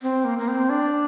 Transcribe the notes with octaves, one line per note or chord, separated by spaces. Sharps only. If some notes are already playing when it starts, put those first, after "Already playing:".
C4
A#3
A#3
C4
D4